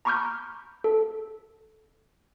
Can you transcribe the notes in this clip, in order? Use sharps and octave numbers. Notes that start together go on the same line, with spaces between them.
A#5 B5 C#6 D6 F6 G6
A4